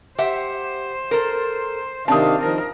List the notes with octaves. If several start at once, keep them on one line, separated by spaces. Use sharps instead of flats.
G4 C5 E5 F#5
A4 A#4
C3 D#3 C4 D4 F5 A5 D#6
D#3 F3 A#4